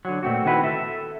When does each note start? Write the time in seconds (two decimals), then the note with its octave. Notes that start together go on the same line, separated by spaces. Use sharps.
0.05 D3 F#3
0.23 A#2 A3 C4 F#4
0.45 D#3 C4 E4 F#4 B4 C5
0.63 A4 E5